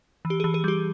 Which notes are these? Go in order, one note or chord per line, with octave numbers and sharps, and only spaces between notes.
E3
G4
E3 G#4
G#4
G3 G4